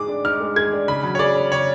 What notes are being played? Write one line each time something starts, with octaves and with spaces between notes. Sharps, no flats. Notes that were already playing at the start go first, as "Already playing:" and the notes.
Already playing: G#2 G#3 G#4 D6
D4
G#2 F6
G#3
G#4 G#6
D4
C#3 B5
F#3
C#5
G#4 D5
C#4
C#3 C#5